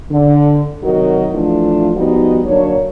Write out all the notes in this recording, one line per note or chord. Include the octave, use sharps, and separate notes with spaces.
D3
C3 D#3 F#3 D#4 F#4 A#4
E3 F3 A3 D4 F4
F3 G3 B3 D#4 F#4
D3 F#3 A#3 D4 C#5